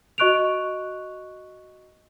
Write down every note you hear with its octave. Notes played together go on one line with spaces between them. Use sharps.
F#4 D#5 C#6 F#6 D7 F7